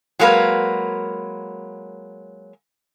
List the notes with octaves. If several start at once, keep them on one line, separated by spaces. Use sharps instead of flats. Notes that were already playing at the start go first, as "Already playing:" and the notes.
F#3 G#3 A#3 A#4 B4